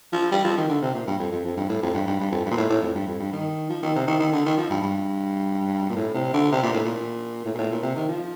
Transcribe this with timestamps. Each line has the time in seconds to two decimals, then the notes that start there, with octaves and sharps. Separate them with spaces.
0.13 F3
0.31 G3
0.44 F3
0.57 D#3
0.69 D3
0.82 C3
0.95 A#2
1.07 G2
1.19 F2
1.32 F2
1.45 F2
1.57 G2
1.69 A2
1.82 F2
1.94 G2
2.07 G2
2.20 G2
2.31 F2
2.45 G2
2.51 A#2
2.57 A2
2.70 A2
2.82 F2
2.95 G2
3.07 F2
3.19 G2
3.33 D#3
3.70 F3
3.83 D#3
3.96 C3
4.07 D#3
4.19 D#3
4.32 D3
4.46 D#3
4.58 F3
4.70 G2
4.82 G2
5.89 A#2
5.96 A2
6.14 C3
6.33 D3
6.52 C3
6.63 A#2
6.73 A2
6.85 A#2
7.46 A2
7.54 A#2
7.58 A2
7.71 A#2
7.83 C3
7.96 D#3
8.09 F3